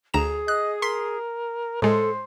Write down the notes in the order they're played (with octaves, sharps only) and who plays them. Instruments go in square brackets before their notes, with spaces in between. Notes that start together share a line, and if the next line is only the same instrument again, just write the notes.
[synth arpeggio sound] D2 A#5 E7 [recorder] G#4
[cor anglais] D#5 [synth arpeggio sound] F#6
[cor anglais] A#4 [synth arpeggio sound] C6 B6 C7
[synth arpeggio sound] A2 G#3 [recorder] A4 [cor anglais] C5